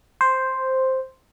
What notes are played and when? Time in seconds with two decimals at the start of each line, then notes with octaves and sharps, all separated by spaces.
0.21 C5